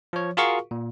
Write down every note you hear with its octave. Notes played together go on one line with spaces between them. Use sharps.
F3 C#5
F4 F#4 G#4 A#4 F5 C#6
A#2